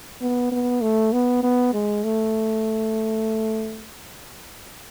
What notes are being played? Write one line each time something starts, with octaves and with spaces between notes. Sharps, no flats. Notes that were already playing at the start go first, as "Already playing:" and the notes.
B3
B3
A3
B3
B3
G#3
A3